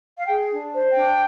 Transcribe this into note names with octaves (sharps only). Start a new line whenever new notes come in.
F5
G#4 G5
D4
C5
G5
D4